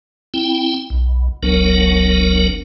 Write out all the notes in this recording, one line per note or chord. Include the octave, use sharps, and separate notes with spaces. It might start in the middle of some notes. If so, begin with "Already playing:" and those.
C4 E4 G5
B1
F#1 C#2 F#3 B3 D4 A#4